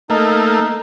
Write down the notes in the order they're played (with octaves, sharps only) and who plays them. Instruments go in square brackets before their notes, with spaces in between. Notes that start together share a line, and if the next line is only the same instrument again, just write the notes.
[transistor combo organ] A3 A#3 [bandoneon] D#4